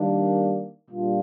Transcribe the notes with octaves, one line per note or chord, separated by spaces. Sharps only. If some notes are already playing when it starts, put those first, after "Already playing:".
Already playing: D#3 G3 A#3 D4
A#2 G3 D4 F4